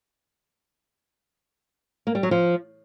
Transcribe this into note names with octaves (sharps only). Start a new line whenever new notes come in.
A#3
G3
F#3
F3